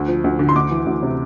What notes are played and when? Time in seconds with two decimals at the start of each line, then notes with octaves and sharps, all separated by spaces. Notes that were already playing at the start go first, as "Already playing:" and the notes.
Already playing: D2
0.08 F3
0.24 D2
0.39 D3
0.49 C6
0.56 D2 D6
0.71 E3
0.86 D2
1.03 C3